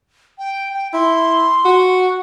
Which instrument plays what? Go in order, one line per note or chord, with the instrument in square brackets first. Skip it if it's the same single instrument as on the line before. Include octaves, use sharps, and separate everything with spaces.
[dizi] G5
G5
[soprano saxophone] E4 [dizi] C6
[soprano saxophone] F#4